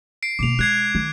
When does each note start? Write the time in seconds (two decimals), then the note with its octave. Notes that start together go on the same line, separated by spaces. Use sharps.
0.23 C7 D7
0.39 B2 A#3 D6 C7 F7
0.59 G#3 F#6 G#6 C7
0.95 D#3